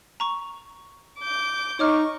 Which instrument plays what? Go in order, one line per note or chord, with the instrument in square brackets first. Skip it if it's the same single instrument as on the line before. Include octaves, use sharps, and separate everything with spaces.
[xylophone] A#5 C#6
[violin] D6 G6
[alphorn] D#4 [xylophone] C#5 D6 F6 [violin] C#6